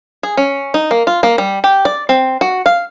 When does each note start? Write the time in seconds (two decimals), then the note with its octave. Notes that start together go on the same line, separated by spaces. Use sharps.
0.23 G#4
0.37 C#4
0.74 D#4
0.91 A#3
1.07 F4
1.23 A#3
1.38 G3
1.64 G4
1.85 D5
2.09 C4
2.41 F#4
2.66 F5